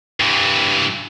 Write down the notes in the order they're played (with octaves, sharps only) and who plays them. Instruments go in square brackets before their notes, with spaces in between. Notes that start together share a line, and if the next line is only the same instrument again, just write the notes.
[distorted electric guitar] G2 E3